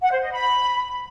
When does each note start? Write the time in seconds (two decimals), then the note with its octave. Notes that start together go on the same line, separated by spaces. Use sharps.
0.02 F#5
0.12 C5
0.22 D#5
0.32 B5